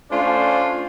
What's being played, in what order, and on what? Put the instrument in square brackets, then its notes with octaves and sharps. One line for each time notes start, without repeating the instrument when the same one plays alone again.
[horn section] A3 C#4 D4 F4 C5 D5